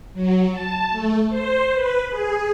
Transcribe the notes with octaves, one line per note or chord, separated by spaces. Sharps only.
F#3
A5
A3
C5
B4
G#4